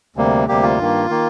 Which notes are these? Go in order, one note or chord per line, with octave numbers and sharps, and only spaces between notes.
D2 C3 G3 A#3
D2 C3 G3 A#3 G4
F4
G2 D#3 A#3
D#3 A#3